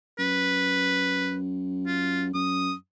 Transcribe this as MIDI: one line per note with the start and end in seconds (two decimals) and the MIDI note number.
0.19 2.31 42
0.19 1.37 71
1.86 2.24 65
2.34 2.73 42
2.34 2.73 87